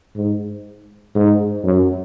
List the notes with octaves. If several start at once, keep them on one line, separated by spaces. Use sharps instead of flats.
G#2
G#2
F#2